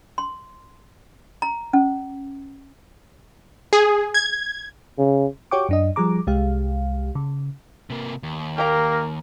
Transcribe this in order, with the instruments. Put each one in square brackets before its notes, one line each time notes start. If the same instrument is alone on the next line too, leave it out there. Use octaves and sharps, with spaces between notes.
[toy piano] C6
A#5
C#4
[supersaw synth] G#4
G#6
[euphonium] C#3
[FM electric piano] F#4 G4 C#5 G5 C#6 D6
F#2 D4 D#5
F3 G3 G#4 A#5 D6
C2 G#3 G4 F5
C#3
[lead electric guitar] C3 A#3
D#2
[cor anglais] A#3 [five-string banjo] G4 F5 A#5 [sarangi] A#4